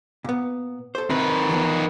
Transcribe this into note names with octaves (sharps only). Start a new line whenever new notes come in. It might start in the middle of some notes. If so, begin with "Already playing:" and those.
A#2 B3
A4 C5
D#3 C4 B4
E3 F3 B3